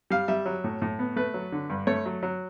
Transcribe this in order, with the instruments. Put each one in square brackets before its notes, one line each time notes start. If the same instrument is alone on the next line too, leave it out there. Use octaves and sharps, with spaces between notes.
[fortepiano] G3 F5
G3 E5
F#3
A2
A2
B3
A3 B4
F#3
D3
G2
A3 C#5
F#3
F#3